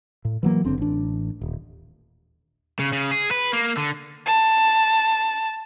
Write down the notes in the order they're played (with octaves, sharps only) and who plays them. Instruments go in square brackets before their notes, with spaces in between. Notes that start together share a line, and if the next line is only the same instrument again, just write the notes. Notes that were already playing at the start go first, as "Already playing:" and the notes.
[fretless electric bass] A2
E3 F#3 A#3
F#1 D3 C4
A1 D4
D#1
[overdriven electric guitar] C#3
C#3
G#4
B4
A#3
D3
[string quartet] A5